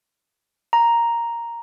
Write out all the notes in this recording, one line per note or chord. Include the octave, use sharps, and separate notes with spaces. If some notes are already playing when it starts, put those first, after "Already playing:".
A#5